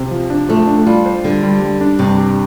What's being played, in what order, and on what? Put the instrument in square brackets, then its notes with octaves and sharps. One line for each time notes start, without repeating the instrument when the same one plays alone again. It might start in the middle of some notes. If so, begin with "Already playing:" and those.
Already playing: [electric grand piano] C3 [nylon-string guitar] C4
[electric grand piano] F3
D4
[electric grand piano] F3 [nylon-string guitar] A3
[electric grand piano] D4
[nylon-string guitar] G3 [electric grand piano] F4
[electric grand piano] C5
[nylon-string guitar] D3 [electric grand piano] G3
[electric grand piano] G3
G3
D4
[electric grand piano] G2 [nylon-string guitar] C3
[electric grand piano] G4